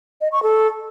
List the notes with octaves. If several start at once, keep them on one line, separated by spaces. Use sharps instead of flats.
D#5
C#6
A4